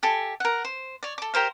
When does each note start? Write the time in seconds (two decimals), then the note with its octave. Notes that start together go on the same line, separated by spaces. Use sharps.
0.03 G4 A4 E5 G#5
0.40 A#4 F#5
0.64 C5
1.03 C#5 D5
1.18 A4 D6
1.34 G4 A#4 C5 F5